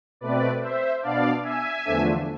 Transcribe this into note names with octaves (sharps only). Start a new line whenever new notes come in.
B2 A3 C4 B4 D5
C5 E5
B2 B3 D4 D5 F5
E5 G#5
E2 D3 F3 A3 D4